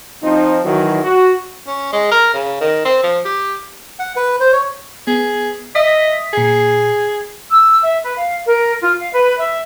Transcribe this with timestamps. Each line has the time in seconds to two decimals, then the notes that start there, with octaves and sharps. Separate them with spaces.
0.23 F3 C4 D#4
0.65 D#3 E3 F#3
1.04 F#4
1.68 C#4
1.93 G#3
2.11 A#4
2.34 C#3
2.61 D#3
2.85 C4
3.03 F3
3.25 G4
3.99 F#5
4.16 B4
4.40 C5
4.53 C#5
5.07 B3 G#4
5.75 D#5 E5 D#6 B6
6.33 A#2 G#4 C7
7.51 E6
7.82 E5
8.04 B4
8.17 F5
8.47 A#4
8.82 F4
8.98 F5
9.13 B4
9.38 E5